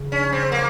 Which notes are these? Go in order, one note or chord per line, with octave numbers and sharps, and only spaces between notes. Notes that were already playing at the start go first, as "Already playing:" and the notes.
Already playing: C#3
C#4
C4
A#3